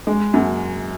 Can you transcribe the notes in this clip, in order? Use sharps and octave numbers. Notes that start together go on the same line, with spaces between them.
G#3
F#2